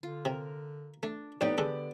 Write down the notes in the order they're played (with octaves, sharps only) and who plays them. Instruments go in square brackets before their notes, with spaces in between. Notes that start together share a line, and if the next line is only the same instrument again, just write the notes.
[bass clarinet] D3 [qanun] F4
[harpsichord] C3 [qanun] A#4
[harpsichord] A3 [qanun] D4
[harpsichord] F2 A2 [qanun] B3 G4 B4 [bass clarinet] D#4 [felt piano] D5
[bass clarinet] D3 [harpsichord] G#3 D4 A4